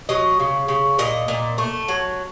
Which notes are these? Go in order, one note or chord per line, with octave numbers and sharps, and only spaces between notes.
F#3 D#5
C#3
C#3
A#2 D#5
A#2
A3
F#3